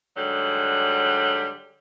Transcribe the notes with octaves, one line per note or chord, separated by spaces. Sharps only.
G#2 D3 F#3 G3